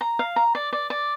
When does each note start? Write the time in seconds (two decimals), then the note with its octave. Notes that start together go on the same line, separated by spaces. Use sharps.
0.01 A#5
0.19 F5
0.36 A#5
0.55 D5
0.73 D5
0.90 D5